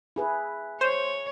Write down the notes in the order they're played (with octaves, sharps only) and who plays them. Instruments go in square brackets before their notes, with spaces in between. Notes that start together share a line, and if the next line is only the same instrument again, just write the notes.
[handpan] E4 G#4 B4
[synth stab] C5 [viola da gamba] C#5